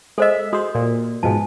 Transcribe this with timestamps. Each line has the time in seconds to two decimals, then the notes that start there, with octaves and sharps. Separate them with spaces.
0.18 G#3 A4 C5 D#5 E5
0.53 G#3 F#4 C5 D#6
0.75 A#2
1.23 G#2 B2 F3 G#5 A5